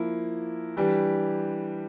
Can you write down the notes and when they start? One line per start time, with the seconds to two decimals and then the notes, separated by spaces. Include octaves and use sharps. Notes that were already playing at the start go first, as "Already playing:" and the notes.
Already playing: F3 A#3 E4
0.77 E3 G3 D4 G4